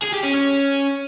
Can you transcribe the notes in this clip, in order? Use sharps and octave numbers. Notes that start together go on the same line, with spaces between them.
G#4
G4
C#4
C#4